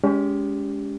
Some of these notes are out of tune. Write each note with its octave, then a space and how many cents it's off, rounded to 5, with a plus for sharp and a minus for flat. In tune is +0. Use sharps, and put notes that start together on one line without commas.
G#3 +0 C#4 +40 G4 +0